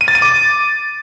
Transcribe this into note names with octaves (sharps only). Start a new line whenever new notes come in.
D#7
A6
D#7
D6